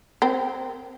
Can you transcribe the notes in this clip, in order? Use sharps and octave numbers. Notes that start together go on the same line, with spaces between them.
C4 A#4